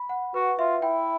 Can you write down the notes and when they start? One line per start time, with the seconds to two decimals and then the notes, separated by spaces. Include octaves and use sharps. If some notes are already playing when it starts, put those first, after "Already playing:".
Already playing: B5
0.09 F#5
0.34 F#4 B4
0.59 F4 E5
0.82 E4 G5